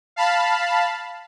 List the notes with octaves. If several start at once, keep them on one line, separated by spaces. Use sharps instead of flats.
F5 A5 B5